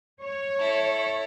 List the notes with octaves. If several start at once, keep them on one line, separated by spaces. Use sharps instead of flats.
C#5
E4 A4